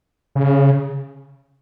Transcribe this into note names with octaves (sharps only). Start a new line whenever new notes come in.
C#3